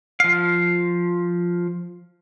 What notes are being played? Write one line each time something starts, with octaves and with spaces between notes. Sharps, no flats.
F3 F5